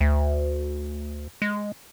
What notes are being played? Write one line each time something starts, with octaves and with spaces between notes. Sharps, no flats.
D2
G#3